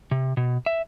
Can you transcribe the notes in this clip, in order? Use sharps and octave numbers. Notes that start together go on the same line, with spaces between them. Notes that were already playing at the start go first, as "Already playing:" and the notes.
C3
B2
E5